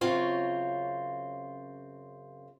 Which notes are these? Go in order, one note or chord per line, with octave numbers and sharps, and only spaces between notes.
F#2 C#3 C4 F4 C#5